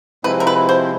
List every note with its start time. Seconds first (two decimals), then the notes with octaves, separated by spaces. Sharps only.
0.24 C3 F3 G#3 C4 E4 B4
0.40 A#4
0.47 B4
0.69 C5